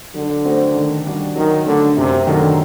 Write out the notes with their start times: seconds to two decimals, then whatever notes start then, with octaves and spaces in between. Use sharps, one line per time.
0.14 D3 F#3
0.44 A3 C4 F#4 C5
0.75 D#3
1.05 G3 D4 F#4
1.36 D#3 F#3
1.66 D3 A3 D4
1.96 F#2 C3
2.26 D3 D#3 F#3 A3